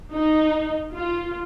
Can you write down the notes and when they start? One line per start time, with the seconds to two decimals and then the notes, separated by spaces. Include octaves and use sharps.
0.13 D#4
0.92 F4